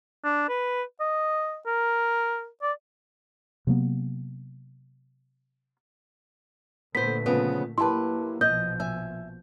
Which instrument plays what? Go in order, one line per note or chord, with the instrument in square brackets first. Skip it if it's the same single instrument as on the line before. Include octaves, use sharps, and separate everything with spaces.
[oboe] D4
B4
D#5
A#4
D5
[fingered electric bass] C3 F#3 A#3 B3
[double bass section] A#2 D3 A3 [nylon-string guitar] B3 C5 [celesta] B6
[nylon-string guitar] C#3 F3 B3
[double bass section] F#3 A#3 [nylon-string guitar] E4 G4 B4 [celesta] A5 C6
[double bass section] A#1 B2 F3 [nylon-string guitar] D#5 [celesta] G6
[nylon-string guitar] E5 G#5